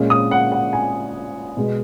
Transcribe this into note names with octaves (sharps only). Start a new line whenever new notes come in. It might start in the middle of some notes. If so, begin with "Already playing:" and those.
Already playing: A#2 G#3 C#4
D#6
F#5
F#5
G#5
B2 G#3 B3